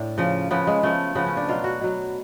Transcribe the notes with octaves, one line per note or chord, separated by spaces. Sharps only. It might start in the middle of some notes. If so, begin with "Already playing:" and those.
Already playing: A2 D4
C#3 F3
C#3 F3 B3
G#3
C#3 F3 A3
C#3 F3 B3
C#4
D4
B2 F#3 F4
F#4
B2 F#3